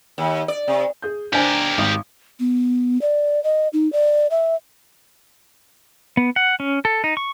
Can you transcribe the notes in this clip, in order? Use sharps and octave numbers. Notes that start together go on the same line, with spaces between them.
D#2
D5
C3
G#4 G6
D4 G4 A#4 C5 G#5
G#1
B3
D5
D#5
D#4
D5
E5
B3
F#5
C#4
A4
D#4
C#6